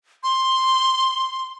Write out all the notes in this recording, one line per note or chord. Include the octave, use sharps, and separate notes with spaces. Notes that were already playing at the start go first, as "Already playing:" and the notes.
C6